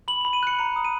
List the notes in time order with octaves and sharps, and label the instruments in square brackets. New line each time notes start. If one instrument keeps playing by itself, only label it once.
[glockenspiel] B5 F#7
B5 F7
D#7
F#6 C#7
A#5 C#7
D#6
D#7